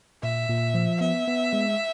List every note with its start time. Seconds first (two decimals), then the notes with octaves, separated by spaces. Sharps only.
0.23 A#2 E5
0.49 A#2
0.74 F3
1.01 B3 E5
1.27 B3
1.53 G#3